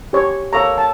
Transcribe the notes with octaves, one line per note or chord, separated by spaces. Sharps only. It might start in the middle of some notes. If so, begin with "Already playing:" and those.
G4 C#5
A#3 A4 C#5 A#5
A5